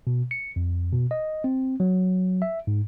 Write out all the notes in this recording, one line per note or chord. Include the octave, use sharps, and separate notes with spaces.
B2
C#7
F2
B2
D#5
C4
F#3
E5
G#2